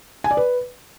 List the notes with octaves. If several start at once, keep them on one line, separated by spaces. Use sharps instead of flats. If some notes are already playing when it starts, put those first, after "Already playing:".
G#5
D5
B4